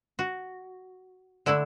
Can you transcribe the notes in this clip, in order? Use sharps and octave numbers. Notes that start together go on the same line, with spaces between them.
F#4
D3 A3 D4 E4